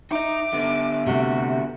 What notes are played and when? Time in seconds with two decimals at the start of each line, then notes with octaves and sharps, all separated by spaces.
0.11 D#4 D#5 E5 D6
0.53 D3 B3
1.06 C3 A3 F#4